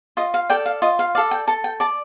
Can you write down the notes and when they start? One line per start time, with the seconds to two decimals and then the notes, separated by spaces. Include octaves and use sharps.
0.17 F4 D#5
0.34 F5
0.50 A4 D5 G5
0.66 F5
0.82 F4 D#5
0.99 F5
1.15 D5 F5
1.18 A4
1.31 G5
1.47 A4 A5
1.64 G5
1.80 D5 A5